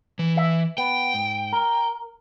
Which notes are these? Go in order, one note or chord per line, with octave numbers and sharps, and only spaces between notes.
E3
E5
B3 G5
G#2
A#4